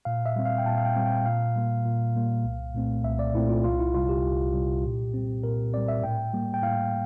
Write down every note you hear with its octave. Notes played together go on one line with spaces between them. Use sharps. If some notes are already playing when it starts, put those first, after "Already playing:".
A#2 F5
E5
G3 C4
F5
G5
A#2 A5
F5
G5
G3 C4
G5
A#2 F5
G3 A#3
A#2
G3 A#3
C2
A#2 A3 C4
C2 E5
D5
A#2 A3 C4 E4
F4
C2 F4
E4
C3 G3 F4
G4
C2
C3 G3
A#2
G3 C4
A#2 A#4
G3 C4 D5
E5
A2 G5
G3 A#3
G5
A2 F5